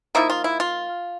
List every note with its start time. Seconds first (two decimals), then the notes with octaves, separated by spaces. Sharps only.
0.15 F3 A#3 D#4 E4
0.30 F4
0.44 E4
0.60 F4